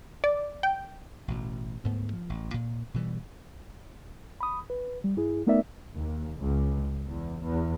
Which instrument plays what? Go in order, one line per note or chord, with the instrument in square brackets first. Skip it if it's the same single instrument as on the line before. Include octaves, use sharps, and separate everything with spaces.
[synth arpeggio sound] D5
G5
[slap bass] A1 B2
D2 G#2 A3 B3
F3
A1
A#2
B2 E3 G3
[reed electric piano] B5 D#6
B4
G3
G2 E4 G#4
A3 B3 D#4 A#4 D5 E5
[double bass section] D#2
C#2
E2
E2